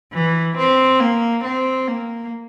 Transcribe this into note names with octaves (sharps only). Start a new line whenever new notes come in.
E3
C4
A#3
C4
A#3